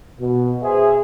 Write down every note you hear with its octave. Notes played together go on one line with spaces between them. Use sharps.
B2
G#4 C5 E5